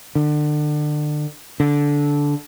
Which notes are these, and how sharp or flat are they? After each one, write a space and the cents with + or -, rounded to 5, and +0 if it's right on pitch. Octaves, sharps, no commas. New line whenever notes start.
D3 +30
D3 -15